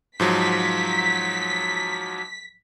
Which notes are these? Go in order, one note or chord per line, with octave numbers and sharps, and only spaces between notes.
G#2 F3 F#3 B6